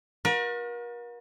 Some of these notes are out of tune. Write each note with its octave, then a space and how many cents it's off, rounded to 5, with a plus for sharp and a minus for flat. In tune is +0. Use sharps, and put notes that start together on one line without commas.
F#4 -45 A#4 +40